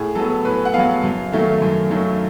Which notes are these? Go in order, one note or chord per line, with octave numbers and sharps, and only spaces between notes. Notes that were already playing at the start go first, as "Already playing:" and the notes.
Already playing: A2 G#4
F#3 B3 A4
A2 B4
F#5
F#3 B3 F5
F#2
D#3 F#3 A3
F#2
D#3 F#3 A3